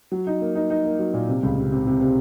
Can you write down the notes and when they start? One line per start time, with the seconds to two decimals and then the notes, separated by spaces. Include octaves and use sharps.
0.12 F#3
0.27 D#4
0.41 A#3
0.56 D#4
0.70 D#4
0.85 A#3
0.99 F#3
1.14 A#2
1.29 C3
1.43 C#2
1.58 C3
1.72 C3
1.87 C3
2.01 C3